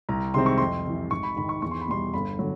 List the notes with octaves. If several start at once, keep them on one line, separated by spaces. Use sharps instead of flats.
C2 A#5
C3 D#3 G#3 C4 C6
C#6
F2 C6
C3 E3
G#1 C#6
B5
G#2 D#3 B5
C#6
E2 C#6
C6
B5
B2 G3 C6
G1 B5
D3 F#3